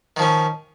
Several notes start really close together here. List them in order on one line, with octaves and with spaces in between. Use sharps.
D#3 F3 C#4